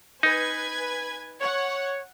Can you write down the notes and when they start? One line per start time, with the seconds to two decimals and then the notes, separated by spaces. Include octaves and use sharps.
0.23 D#4 B4 G#5 G#6
1.41 C#5 F#5